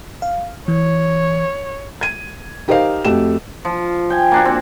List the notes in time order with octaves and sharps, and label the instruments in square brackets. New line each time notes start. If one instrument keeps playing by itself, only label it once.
[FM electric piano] F5
[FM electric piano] E3 [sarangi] C#5
[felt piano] G#6 D#7
D#4 G4 A#4 C5 D#5 F5
F2 A3 F#4 G4 E7
[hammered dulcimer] F3
G5 G#5
A#3 D4 F#4
C4